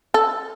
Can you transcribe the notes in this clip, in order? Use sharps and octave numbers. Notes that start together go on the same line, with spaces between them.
A4